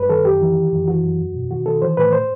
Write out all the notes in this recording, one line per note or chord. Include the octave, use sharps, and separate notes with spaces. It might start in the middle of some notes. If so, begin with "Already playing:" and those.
Already playing: G2 B4
D#3 A4
F#2 G4
E3
D#3
F#2
E3 F#4
F#2
E2
B2
D#3 F#4
D#3 A4
E3 C5
A2 B4
C5